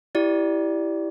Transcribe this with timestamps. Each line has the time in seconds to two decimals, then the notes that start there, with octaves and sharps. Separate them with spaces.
0.15 E4 G4 D5